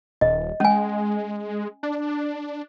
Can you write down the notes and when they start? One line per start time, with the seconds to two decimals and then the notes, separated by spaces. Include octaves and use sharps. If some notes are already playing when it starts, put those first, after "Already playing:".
0.21 D#1 D#5
0.60 G#3 C#4 G#5
1.83 D4